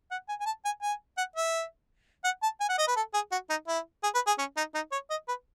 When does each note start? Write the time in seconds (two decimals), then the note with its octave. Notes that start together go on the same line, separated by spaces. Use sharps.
0.11 F#5
0.29 G#5
0.40 G#5
0.46 A5
0.65 G#5
0.82 G#5
1.17 F#5
1.36 E5
2.24 F#5
2.43 A5
2.60 G#5
2.69 F#5
2.78 D#5
2.87 B4
2.96 A4
3.14 G#4
3.31 F#4
3.50 D#4
3.68 E4
4.03 G#4
4.14 B4
4.27 G#4
4.38 C#4
4.57 D#4
4.75 D#4
4.92 C#5
5.10 D#5
5.28 B4